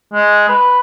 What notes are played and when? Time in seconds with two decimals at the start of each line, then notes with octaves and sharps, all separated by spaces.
0.13 G#3
0.49 B4